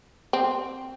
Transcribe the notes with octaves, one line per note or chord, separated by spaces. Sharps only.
C4